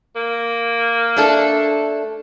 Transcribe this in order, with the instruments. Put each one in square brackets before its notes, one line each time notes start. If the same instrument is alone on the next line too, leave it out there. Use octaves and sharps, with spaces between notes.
[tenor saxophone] A#3
[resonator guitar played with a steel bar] A3 D4 A4